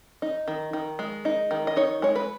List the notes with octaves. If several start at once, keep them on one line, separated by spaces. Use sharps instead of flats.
D#4
D#3
D#3
G#3
D#4
D#3
D#5
D#4 C#5
G#3 C#5
B4